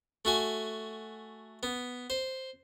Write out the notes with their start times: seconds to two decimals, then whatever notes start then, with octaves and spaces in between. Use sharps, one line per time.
0.25 A3 F#4 G#5
1.63 B3
2.10 C5